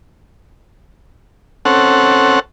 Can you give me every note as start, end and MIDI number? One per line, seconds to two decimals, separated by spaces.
1.65 2.40 60
1.65 2.40 61
1.65 2.40 69
1.65 2.40 78